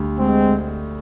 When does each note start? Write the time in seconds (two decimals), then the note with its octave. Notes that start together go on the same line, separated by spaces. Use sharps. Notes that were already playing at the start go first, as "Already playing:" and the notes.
Already playing: D2 G3
0.18 G#3 C4